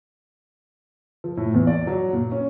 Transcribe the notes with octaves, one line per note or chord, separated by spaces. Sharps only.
F3
A2
E2
D5
F#3
A#2
C#4